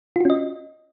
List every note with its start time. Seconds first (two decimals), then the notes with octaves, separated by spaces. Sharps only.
0.16 F4
0.20 F#4
0.25 C#4
0.30 D#5